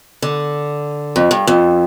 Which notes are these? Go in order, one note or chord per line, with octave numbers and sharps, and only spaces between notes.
D3
F2
G2
F2